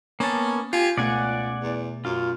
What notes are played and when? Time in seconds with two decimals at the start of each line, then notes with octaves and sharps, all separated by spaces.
0.20 A#3 B3 C#4 A5
0.73 F4 G4 G#5
0.98 C#2 B2 A3 D5 F#5 G#5
1.62 E2
2.05 F#2 F4